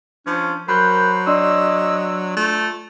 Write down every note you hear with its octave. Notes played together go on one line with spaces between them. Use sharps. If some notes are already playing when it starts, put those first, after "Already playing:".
F3 C#4 D4
F#3 A#4 C5 B5 F#6 G6
D4 D5 D#5 C6 E6
A3 F4